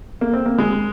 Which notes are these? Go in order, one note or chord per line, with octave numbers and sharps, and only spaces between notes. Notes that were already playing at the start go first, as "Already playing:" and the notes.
A#3
C4
A#3
G#3